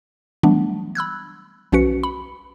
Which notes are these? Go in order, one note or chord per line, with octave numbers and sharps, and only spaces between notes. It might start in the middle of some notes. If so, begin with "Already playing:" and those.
E3 F#3 G3 A3 B3 D4
B5 E6 F#6 G#6
B1 F3 C#4 F#4 B4 C#7
B5